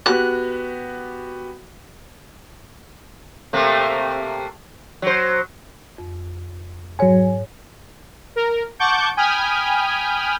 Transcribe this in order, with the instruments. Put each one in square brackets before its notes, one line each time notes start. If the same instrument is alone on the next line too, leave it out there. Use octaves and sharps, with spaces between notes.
[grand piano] B3 F#4 G4 [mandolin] F#6
[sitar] C3 A3 A#3
F#3 C5
[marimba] F2
[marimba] G#2 C#5 [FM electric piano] F#3 G#5
[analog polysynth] A#4
F#5 A5 C#6 D6 G6
G5 G#5 B5 D#6 F6